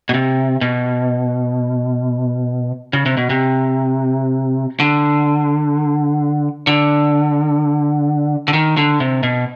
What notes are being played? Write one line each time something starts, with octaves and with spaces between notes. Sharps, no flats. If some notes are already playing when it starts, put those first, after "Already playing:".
B2
C3
B2
C#3
C3
B2
C3
D3
D3
D3
D#3
D3
C3
B2